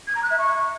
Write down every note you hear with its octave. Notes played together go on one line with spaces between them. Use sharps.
G#6
A#5
F#6
E5
C#6